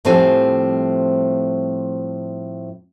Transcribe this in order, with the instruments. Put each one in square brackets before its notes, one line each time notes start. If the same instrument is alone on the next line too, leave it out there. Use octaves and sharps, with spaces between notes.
[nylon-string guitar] A2 F3 G3 C4 A4 G#5